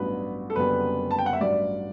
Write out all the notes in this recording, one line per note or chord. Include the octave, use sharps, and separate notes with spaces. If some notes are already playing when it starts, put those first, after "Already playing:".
Already playing: A1 G2 F#3 B3 D4 B4
A4
F#1 F#2 D3 G3 B3 B4
A5
G5
F#5
E5
A1 G2 F#3 D5